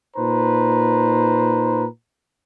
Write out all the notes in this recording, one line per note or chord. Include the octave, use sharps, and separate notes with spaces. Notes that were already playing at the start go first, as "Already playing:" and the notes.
A#2 D#4 B4 C5 A#5